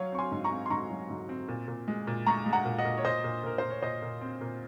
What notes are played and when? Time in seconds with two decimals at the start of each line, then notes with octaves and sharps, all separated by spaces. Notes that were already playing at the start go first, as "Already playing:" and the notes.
Already playing: F#3 C#5 F5
0.12 C4 C#6
0.18 G#5 C6
0.32 G#2
0.44 A#5 C#6
0.51 C4
0.66 C6
0.70 G#2 A#5 C#6
0.90 F#3
1.10 G#2
1.29 C4
1.49 A#2
1.68 A#2
1.88 G#3
2.07 A#2
2.26 G#3 A#5 C#6
2.46 G#3
2.53 F#5 A#5
2.65 A#2
2.78 D#5 F#5
2.85 A#2
2.98 C#5
3.05 A#2 C5 D#5
3.24 A#2
3.43 A#2 A#4
3.58 A#2 C5
3.70 C#5
3.83 A#2 C5 D#5
4.03 A#2
4.21 C4
4.41 A#2